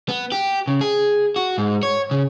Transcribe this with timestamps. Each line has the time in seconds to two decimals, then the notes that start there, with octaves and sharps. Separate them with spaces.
0.09 B3
0.32 G4
0.68 C#3
0.81 G#4
1.36 F#4
1.58 G#2
1.83 C#5
2.11 C#3